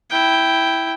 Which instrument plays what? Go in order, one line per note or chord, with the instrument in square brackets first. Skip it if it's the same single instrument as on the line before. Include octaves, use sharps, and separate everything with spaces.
[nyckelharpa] E4 G5